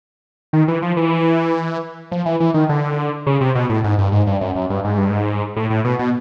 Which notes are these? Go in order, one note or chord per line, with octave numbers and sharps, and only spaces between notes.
D#3
E3
F3
E3
F3
E3
E3
D#3
D3
C#3
C3
B2
A2
G#2
G2
G#2
G2
F#2
F#2
G2
G#2
G2
G#2
A2
A2
B2
B2